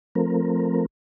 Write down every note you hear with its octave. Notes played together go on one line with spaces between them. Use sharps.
F3 A3 C4 A#4